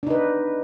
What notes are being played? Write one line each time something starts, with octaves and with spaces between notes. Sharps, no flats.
D4 D#4 B4